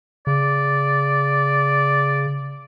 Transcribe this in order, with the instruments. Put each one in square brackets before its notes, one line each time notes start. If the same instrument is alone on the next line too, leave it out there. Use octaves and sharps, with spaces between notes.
[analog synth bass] C#3 [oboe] D5